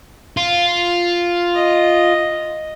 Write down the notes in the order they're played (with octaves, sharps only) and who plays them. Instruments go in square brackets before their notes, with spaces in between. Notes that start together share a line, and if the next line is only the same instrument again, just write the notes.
[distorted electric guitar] F4
[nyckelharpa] D#5